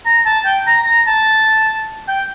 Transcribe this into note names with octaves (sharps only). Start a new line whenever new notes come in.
A#5
A5
G5
A#5
A#5
A5
G5